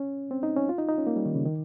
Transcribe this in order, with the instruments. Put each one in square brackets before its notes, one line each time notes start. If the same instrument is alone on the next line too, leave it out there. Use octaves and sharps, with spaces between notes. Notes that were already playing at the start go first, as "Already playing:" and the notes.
Already playing: [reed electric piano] C#4
C4
D#4
C#4
F4
D#4
D#4
C#4
A#3
G3
D#3
C#3
D#3